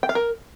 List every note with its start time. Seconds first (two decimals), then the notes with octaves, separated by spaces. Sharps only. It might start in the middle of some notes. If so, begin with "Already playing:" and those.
0.03 G5
0.09 F5
0.15 A#4